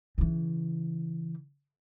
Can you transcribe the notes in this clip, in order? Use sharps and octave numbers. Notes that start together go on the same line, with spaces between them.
C#3 E3